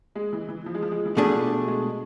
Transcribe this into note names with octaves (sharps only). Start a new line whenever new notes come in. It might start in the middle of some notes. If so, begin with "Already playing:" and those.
G#3
E3
E3
F3
G#3
F3
G#3
E3
B2 F3 A3 D4 G#4 D5
G#3